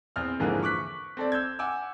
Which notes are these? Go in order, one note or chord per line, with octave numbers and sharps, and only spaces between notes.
E2 C4 C5 F6
G#1 D3 E3 F3 A#3 G#4
C#6 D6 F#6 B6
C4 A4 D5
E6 G6 G#6
F#5 G#5 D6 E6